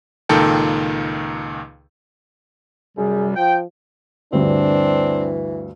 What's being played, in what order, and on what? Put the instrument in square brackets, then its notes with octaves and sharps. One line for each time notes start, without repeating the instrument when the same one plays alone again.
[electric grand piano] C#2 A#2 D#3 D#4 A4 G5
[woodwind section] F#2 C3 G3 [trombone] G#4
[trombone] F3 [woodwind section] G5
[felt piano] D2 G2 [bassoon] E3 [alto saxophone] C4 [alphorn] D4